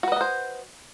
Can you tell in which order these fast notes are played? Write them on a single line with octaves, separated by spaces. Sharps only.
F#4 B4 D#5 B3 C5